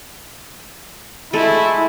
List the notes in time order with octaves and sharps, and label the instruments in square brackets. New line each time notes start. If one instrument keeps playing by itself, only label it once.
[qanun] G#3 A3 A4 [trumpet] E4